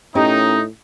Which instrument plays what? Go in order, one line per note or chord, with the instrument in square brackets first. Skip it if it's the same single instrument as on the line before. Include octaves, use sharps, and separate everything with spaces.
[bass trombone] A2 [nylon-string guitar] C#4 G4 A#4 [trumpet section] D#4